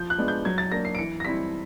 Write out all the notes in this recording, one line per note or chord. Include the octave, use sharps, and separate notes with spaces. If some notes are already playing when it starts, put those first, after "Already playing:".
Already playing: F3 G6
F#6
G#3 B3 D4
G6
F#3 G#6
A6
A#3 D4 A#6
C7
D7
E3 C#7
A#6
G3 C4 E4 B6